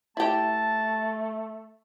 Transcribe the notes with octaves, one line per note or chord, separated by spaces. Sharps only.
A3 E4 G4 A5